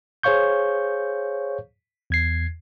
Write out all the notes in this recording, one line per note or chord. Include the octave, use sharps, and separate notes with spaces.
G#4 C5 C#5 F5 C#6 G6
E2 G#6 C7